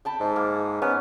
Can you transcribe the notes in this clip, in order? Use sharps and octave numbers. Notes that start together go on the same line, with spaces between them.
G5 A5 B5
G#2
A#3
B3 C#4